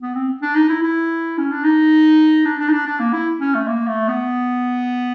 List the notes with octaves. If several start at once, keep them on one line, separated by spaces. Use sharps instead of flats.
B3
C4
D4
D#4
E4
E4
C#4
D4
D#4
D4
D4
D#4
D4
D4
A#3
E4
C#4
A3
A#3
A3
B3